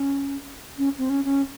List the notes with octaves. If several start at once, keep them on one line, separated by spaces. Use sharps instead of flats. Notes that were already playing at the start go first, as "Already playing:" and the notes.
Already playing: C#4
C#4
C4
C#4
C#4